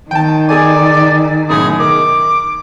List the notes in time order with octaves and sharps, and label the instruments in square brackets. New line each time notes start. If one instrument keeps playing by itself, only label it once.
[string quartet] D#3 [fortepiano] G5 A5
[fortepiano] G#4 A4 G#5 [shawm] D5
[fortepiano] F#2 A2 [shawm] G#4
[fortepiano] D#3 [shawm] D6